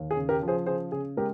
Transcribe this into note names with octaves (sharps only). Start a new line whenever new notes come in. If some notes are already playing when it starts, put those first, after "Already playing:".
Already playing: D#2
G#4
C#3
G4 A#4
F3
G#4 C5
C#3 G#4 C5
C#3 G#4
G#3 G4 A#4